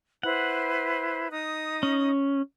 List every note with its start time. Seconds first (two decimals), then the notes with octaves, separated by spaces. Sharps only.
0.23 E4 B4 C5 F#5
1.30 D#4 D#6
1.83 C#4